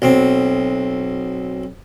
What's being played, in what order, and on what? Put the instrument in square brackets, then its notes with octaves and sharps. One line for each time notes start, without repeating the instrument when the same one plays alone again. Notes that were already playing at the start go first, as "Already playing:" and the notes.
[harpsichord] B1 C4